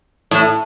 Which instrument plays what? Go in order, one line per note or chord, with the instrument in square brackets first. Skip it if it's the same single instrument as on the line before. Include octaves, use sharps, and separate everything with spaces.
[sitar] A2